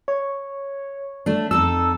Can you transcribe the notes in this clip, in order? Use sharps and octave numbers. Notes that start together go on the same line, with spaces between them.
C#5
A3 D4
F2 D#4 A4 E6